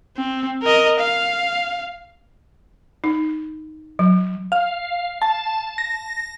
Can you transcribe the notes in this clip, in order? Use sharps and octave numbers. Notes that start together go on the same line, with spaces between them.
C4
A#4 D#5
F5
D#4
F#3
F5
A5
A#6